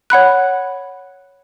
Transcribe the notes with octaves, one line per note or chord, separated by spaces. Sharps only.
C#5 F#5 B5 F#6